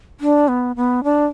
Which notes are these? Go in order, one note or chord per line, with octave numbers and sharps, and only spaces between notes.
D4
B3
B3
D4